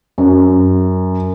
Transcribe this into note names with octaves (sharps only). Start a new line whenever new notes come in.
F#2